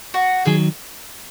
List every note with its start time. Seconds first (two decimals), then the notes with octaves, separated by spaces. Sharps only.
0.14 F#4
0.45 D#3 F#3 G#4